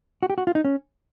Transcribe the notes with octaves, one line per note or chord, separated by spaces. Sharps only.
F#4
G4
F#4
F4
D#4
C#4